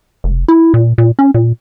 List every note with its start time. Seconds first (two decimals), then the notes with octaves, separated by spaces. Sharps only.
0.24 F1
0.48 E4
0.74 A#2
0.98 A#2
1.19 C#4
1.34 A#2